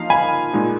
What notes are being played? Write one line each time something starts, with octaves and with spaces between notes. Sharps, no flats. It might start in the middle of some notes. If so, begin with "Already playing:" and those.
Already playing: F3 A#3 D#4 F5
G#5 B5
A#2 G#3 D#4